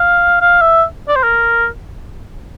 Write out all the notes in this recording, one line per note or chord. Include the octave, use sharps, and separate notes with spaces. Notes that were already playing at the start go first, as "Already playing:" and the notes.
Already playing: F5
F5
E5
D5
C5
A#4